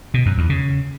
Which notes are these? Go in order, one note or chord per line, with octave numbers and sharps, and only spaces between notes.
B2
F#2
E2
C#3